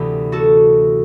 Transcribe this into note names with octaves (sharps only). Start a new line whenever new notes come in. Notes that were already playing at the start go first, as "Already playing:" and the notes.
Already playing: D2 C3 E3 B3 G4
F#4 A4